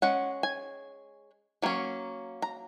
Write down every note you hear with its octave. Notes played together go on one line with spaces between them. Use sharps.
G#3 C#4 F#5
G#5
F#3 A#3 C#4
A#5